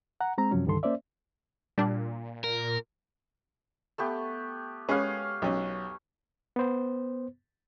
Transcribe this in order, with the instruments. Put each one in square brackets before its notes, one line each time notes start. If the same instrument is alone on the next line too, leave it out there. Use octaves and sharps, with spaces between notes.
[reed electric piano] F#5 A#5
G#3 C4 A#5
F#2 C3 F3 F#3 C#4
C2 G2 D3 D#3 A4 C6
A#3 C#4 C5 D5 E5
[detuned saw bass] A#2 [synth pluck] G3 D4
[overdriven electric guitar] A#4
[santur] A3 B3 G4
[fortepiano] G#3 C#4 G#4 [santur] B4 C#5 F5
[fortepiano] B1 C#4
[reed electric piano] B3 C5